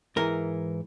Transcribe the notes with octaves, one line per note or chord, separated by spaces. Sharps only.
G#2 E3 A#4